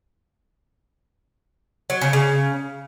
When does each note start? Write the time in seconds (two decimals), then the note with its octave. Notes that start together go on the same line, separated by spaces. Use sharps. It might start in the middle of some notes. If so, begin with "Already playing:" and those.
1.90 F#3
2.01 C#3
2.13 C#3